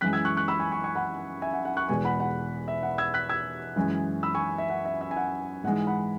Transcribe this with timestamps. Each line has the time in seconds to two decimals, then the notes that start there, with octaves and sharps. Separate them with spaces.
0.01 F#2 E3 G#3 F#6 B6
0.13 E6 G#6
0.25 C#6 F#6
0.37 C#6 F#6
0.48 B5 E6
0.59 G#5 C#6
0.72 G#5 C#6
0.84 G#5 C#6
0.95 F#5 B5
1.42 E5 G#5
1.53 F#5
1.65 F#5
1.77 C#6 F#6
1.88 E2 B2 G#3 G#5 C#6
2.05 F#5 B5
2.20 F#5
2.68 E5
2.83 F#5
2.98 E6 G#6
3.14 F#6 B6
3.29 E6 G#6
3.76 F#2 E3 G#3
4.23 B5 E6
4.35 G#5 C#6
4.58 E5
4.70 F#5
4.85 E5
5.01 E5
5.11 G#5
5.17 F#5
5.63 G#2 E3 G#3 F#5
5.87 F#5 B5